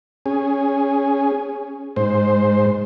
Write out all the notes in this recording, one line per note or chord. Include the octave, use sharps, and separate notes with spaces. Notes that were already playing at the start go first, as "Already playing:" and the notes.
C#4 G#4
G#2 C5